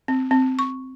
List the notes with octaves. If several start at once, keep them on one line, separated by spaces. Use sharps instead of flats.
C4
C4
C#6